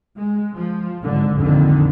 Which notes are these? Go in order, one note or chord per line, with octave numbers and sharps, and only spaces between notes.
G#3
F3
G#1 D3
A#1 F2 D3 D#3